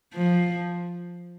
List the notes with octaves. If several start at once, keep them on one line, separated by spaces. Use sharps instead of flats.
F3